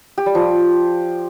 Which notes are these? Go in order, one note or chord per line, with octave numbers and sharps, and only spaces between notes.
G4
G3
F3